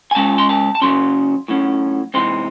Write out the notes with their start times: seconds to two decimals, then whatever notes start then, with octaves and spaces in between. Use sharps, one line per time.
0.11 G#5
0.15 C#3 G#3 C#4 A5
0.38 C6
0.49 A5
0.75 A5
0.82 C#3 F#3 C#4 C6
1.48 A2 F#3 C#4
2.14 C3 E3 G#3 C4 D#4 C6